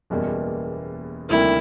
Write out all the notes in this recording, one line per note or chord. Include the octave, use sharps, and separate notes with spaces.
F#1 E2 B2 G3 A#3
D2 C3 D#3 G3 A#3 E4